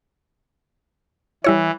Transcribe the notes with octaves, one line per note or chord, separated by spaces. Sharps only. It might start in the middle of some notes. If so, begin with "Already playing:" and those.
E3 G3 E4 C#5